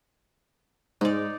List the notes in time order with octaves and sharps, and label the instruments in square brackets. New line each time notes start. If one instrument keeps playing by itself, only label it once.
[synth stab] G#2 [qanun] D#4 D5